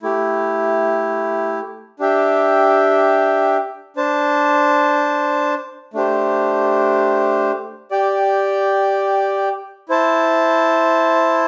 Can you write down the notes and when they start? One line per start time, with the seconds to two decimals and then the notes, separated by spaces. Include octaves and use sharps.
0.02 A3 E4 G4
1.99 D4 G4 E5 G5
3.96 D4 C5 A5
5.94 A3 D4 G4 C5
7.91 G4 D5 G5
9.89 E4 C5 A5